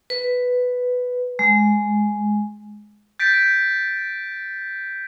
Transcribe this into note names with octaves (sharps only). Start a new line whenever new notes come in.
B4
G#3
G6 A6 B6 D7